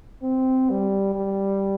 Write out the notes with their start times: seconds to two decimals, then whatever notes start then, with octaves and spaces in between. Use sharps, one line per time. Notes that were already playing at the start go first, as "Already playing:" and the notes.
0.22 C4
0.70 G3
1.15 G3